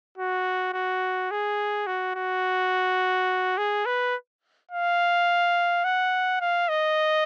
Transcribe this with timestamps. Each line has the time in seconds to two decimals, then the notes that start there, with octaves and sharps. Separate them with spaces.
0.18 F#4
0.73 F#4
1.31 G#4
1.87 F#4
2.15 F#4
3.58 G#4
3.86 B4
4.71 F5
5.85 F#5
6.41 F5
6.69 D#5